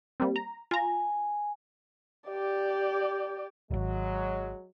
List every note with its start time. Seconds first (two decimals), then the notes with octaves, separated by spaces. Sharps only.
0.20 G3 A#3 C4
0.36 A#5
0.71 F4 G#5 A#5
2.28 G4 D5
3.71 D1 G#1 F#3 G#3